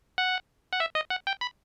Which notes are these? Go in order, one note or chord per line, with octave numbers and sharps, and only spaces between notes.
F#5
F#5
E5
D#5
F#5
G5
B5